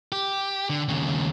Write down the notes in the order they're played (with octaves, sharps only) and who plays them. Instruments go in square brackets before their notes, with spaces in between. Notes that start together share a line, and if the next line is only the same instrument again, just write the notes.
[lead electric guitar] G4
D3
D#2 C#3